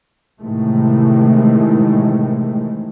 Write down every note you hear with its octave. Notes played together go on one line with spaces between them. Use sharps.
A2 C3 D#3 E3 G#3 A3